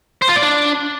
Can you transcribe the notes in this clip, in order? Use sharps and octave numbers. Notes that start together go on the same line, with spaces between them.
C5
F4
D5
D4